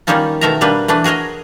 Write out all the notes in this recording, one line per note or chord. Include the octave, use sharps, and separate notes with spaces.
D#3 G3 A#3 C#4 D#4 F4
B2 D#3 A3 A#4 E5 A#5
B2 G3 A#3 D4 B4
E3 A3 D4 B4
F#4 G#4 A#4 C#5 D#5